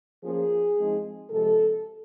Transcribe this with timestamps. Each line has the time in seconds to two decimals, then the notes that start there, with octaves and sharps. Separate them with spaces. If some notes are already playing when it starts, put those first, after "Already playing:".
0.24 F3 A#3 C#4 G#4
0.78 F3 G#3 C4 D#4
1.31 C3 F3 G#3 A4